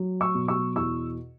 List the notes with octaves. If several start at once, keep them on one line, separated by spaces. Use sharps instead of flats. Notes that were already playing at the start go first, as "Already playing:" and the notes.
Already playing: F#3
C#6 E6
B2
C#6 E6
E2 C#6 E6